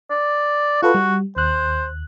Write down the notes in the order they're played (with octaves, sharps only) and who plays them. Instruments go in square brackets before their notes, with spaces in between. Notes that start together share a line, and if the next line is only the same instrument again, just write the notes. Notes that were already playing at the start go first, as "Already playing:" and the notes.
[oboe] D5
[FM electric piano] F4 A4 B4 [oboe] F#4
[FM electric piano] G3
[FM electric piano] D#2 F#6 [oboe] C5